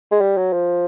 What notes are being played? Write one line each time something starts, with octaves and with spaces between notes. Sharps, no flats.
G#3
G3
F#3
F3